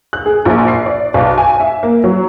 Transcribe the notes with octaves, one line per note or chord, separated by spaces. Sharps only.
F#6
G#4
A#1
C7
D5
B1
G#5
E5
A#3
F#3